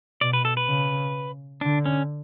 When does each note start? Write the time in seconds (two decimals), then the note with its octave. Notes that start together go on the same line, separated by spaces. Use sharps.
0.21 B2 D5
0.33 B4
0.45 A4
0.57 B4
0.68 C#3
1.61 D3 D4
1.86 C#4